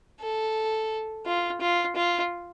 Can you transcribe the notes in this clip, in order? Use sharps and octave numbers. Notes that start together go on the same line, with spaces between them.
A4
F4
F4
F4